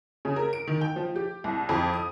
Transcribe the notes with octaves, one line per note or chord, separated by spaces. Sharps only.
C#3
A#4
D7
D#3
G5
F3
G4
C2
F2
D#6